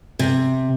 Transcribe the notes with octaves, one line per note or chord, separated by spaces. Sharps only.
C3